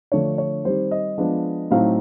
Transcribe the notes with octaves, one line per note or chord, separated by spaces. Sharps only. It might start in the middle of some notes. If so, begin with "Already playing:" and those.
D3 F3 A3 D4 C#5
C#5
D#3 G3 C4 C5
D#5
F3 G#3 B3 D4
A2 F#3 A3 C4 D#4 F5